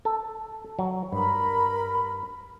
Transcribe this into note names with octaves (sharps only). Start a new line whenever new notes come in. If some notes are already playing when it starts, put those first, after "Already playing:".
A4
F#3
G2 A#4 B5